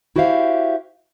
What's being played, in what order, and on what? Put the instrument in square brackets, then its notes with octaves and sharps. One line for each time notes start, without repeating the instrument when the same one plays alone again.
[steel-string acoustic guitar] E4 F#4 G4 C5 E5 F5